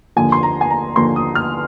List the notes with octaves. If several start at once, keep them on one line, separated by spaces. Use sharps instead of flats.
D#2 D3 F3 G#5
C6
A#5
G#5
A#5
D#2 D3 F3 C6
D#6
F6